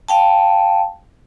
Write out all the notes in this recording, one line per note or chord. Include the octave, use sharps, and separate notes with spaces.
F5 G5 A5